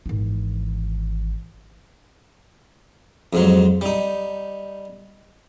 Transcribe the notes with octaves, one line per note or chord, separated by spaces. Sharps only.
G#1 E3
F2 G#2 F#3
G3 D#4